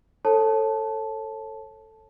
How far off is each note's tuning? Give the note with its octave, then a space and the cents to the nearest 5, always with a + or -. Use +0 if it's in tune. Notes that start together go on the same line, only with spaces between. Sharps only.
A4 +10 C#5 -30 A5 -10